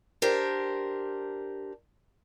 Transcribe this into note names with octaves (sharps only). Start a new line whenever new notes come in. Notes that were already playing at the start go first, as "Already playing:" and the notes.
D4 G4 A#4 C5